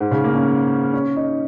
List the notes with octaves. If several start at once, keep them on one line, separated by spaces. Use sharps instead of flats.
G#2
C#3
A#3
C#4
C#4
D#4